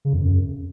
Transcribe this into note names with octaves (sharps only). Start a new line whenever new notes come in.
C#3
F2
F#2